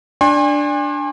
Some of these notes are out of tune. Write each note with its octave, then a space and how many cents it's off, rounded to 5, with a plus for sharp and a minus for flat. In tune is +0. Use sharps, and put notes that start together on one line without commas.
D4 +0 G#5 -40 C6 +40